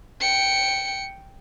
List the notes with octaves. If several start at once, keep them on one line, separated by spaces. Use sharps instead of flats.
G5 C#7